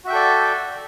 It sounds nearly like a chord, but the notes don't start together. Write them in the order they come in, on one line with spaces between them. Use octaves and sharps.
F#4 E5 G5 A4 D5